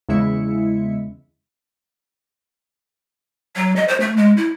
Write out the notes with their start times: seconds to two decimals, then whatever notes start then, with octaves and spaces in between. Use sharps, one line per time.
0.09 E2 C#3 G#3 E4 E5 C#7
3.56 F#3
3.76 D#5
3.88 C5
4.00 A3
4.17 G#3
4.37 E4